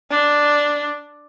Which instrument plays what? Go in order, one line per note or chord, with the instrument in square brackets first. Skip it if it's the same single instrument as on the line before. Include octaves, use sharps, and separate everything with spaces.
[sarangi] D4